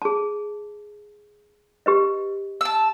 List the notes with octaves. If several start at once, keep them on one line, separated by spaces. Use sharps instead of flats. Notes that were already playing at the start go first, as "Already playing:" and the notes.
G#4 A5
G4 B4 D#5
A5 E6